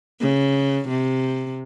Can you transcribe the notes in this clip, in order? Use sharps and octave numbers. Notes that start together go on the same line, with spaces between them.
C#3
C3